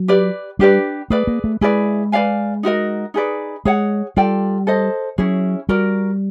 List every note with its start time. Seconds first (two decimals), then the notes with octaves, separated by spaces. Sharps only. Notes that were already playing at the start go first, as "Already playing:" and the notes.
Already playing: F#3
0.08 G4 B4 D5
0.59 G3 D4 G4 B4 D5
1.10 A3 G#4 B4 D5
1.27 A#3
1.44 A3
1.61 G#3 E4 G#4 B4 D5
2.12 B4 D5 F5 G#5
2.63 D#4 F#4 A#4 D#5
3.14 D#4 G#4 B4 D5
3.65 G#3 G#4 C#5 F#5
4.16 G3 F4 A4 D5 G5
4.67 A4 C5 D#5
5.18 F#3 C#4 E4 G#4 C#5
5.69 G3 F#4 A#4 D5